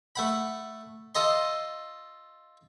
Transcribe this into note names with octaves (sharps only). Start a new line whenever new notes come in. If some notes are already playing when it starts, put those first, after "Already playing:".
A3 F#5 B5
F4 A4 D#5 C6